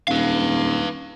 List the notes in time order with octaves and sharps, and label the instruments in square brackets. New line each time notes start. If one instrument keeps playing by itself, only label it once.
[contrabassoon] D#1 [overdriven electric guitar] B4 F5